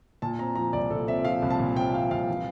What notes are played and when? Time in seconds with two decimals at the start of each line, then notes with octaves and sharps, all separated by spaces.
0.22 A#2 A5
0.39 C4 A#5
0.56 F3 A#5
0.73 C2 D5
0.90 A#2 A4
1.07 C4 E5
1.25 F3 F5
1.42 C2
1.50 A5
1.60 A#2
1.76 C4 G5
1.94 F3 F5
2.11 C2 F5
2.29 E3